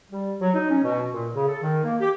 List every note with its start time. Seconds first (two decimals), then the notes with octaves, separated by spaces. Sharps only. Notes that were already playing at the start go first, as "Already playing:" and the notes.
0.11 G3
0.40 F#3
0.54 D#4
0.70 C#4
0.83 B2
1.13 A#2
1.34 C#3
1.48 A4
1.62 D#3
1.84 A#3
2.00 G4